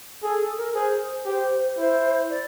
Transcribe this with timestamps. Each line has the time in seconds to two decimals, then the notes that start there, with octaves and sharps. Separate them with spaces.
0.23 G#4 A4
0.40 A4
0.57 A#4
0.74 G#4 C5
1.26 G4 C5
1.78 E4 C5
2.30 D5